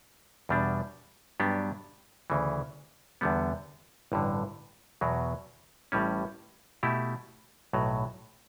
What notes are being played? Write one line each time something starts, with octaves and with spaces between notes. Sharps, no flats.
E2 B2 G3 D4
G2 F#3 B3 D4 G4
D2 C#3 E3
E2 D3 G3 B3
A1 G2 D3
E2 B2 F#3
A1 A2 G3 C#4
B2 A3 E4 G4
B1 A2 F#3